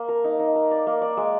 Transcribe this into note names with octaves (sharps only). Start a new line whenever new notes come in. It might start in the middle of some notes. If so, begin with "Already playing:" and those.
Already playing: A#3
A#4
D#4
D#4
A#4
D5
A#3
D5
G#3